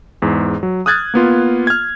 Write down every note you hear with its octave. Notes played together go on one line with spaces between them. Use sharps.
E2 G#2
F#3
D#6 F6 F#6 G#6 A6
A#3 B3 F4
F6 G#6